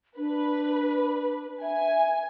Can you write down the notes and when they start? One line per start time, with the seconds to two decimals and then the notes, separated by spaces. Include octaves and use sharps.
0.18 D4 B4
1.62 E5 G#5